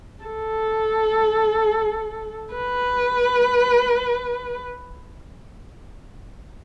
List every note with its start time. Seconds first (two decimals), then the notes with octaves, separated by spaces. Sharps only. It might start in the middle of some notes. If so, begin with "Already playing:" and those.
0.25 A4
2.54 B4